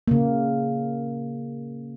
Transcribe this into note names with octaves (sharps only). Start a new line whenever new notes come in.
C#3 A#3